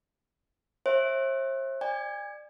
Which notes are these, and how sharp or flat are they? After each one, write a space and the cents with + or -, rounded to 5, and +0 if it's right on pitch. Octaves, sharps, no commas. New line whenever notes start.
C5 +40 E5 +0
D5 +30 G#5 -35